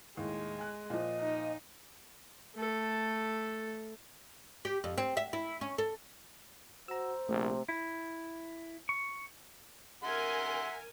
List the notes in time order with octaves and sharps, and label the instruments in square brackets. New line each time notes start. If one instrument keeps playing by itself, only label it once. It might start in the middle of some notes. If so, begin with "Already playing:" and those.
[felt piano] D#2 A2 [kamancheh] G#3
[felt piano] G#5 F#6
[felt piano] A#2 F3 [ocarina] D#5
[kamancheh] D#4
[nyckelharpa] A3 A4
[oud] G4
F2
C4
E5
E4
C#4
A4
[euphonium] F#4 [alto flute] C5 [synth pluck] A#5 E6
[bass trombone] A#1 [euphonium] C3 [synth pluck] A3
[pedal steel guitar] E4
C#6
[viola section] A#4 G#5 [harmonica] E5 F#5 C6